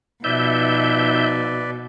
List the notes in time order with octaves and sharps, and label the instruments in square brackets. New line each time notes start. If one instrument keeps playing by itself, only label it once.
[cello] B2 [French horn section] F3 D#4 [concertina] B4 D5 [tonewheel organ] E5 G6